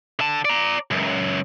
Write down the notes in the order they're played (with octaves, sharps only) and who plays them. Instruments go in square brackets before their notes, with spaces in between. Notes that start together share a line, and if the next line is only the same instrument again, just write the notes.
[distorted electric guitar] D3 A5
D5 A#5
C#2 F#2